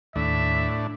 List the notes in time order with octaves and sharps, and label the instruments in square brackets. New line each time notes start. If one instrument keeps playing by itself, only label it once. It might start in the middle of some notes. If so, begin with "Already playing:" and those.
[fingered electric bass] D#2 [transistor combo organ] A2 D4 [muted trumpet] E5